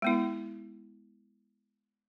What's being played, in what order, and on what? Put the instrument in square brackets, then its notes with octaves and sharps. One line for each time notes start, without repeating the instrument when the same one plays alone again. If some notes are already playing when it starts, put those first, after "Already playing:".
[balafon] G#3 B3 E4